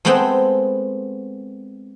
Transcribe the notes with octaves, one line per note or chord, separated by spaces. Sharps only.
G#3 A3 B3 C4 G5